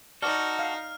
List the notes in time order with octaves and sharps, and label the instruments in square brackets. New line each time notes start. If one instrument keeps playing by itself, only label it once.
[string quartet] D#4 [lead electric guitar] F#4 A4 [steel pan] D5 [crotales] F6
[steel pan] F5